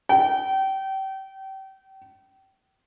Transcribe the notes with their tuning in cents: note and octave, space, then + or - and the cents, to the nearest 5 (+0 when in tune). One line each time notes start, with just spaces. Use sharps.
G5 -30